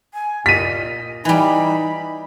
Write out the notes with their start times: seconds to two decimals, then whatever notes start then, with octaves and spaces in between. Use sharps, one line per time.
0.14 G#5
0.46 A#2 D#5 B6 D#7
1.25 E3 G3 D#4 B5